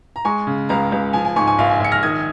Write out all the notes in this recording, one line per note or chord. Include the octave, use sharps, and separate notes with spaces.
A#5
G#3 G#5 C#6
C#3
C#2 F5 A#5
C#2
F3 G#5
G#5
G#2 G#5 C#6
G#5 C#6
A#1 F5
G#5
A#1 C#7
F6 A#6
D#3 D#6 G#6